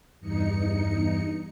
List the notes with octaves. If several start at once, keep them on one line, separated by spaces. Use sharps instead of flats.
E2 G2 D#4 C#7